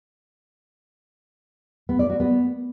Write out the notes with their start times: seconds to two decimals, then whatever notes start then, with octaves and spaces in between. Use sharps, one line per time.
1.89 B3
1.99 D5
2.10 F#4
2.20 B3